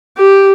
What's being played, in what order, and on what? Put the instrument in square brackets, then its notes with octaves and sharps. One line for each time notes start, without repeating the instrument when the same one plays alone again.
[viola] G4